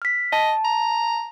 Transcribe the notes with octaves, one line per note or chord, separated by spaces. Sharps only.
F6 B6
D#5 A5
A#5